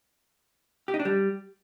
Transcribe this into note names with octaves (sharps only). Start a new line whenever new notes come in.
G4
D#4
D4
G3